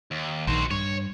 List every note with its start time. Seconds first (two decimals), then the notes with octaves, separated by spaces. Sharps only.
0.11 D#2
0.47 A#1 D#3 F#4 C5
0.71 G2 C#5